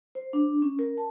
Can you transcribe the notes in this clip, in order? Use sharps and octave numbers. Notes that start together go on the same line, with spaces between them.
C5
D4
C#4
A#4
A5